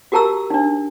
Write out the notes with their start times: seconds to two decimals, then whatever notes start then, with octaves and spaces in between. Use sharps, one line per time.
0.12 F#4 G4 A#4 A5 A#5 E6
0.50 D4 D#4